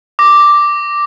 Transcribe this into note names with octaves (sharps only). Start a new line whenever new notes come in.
D6 A#6